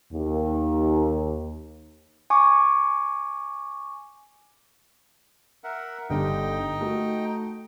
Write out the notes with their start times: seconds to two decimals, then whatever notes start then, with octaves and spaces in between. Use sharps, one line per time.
0.13 D#2
2.30 G#5 C#6 D6
5.64 A#4 E5 F#5
6.10 G1 D3 G3 D#4 D#5 G5
6.81 A3 F#4